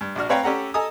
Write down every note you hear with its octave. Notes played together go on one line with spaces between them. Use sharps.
G2
A#1 D4 F#4 F6
C4 B4 C#5 F5 G5 A#5
C#4 G4 A4 F#5 A#5
A4 D#5 G#5 A#5 D#6